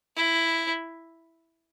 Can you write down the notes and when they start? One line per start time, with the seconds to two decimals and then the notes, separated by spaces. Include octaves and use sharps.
0.16 E4